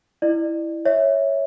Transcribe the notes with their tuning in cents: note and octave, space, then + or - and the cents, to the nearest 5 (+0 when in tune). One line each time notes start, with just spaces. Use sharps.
E4 +0 D5 +35
C#5 +0 E5 -15